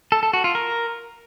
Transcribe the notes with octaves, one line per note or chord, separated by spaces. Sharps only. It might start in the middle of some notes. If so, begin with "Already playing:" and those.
A4
A4
F#4
F4
A#4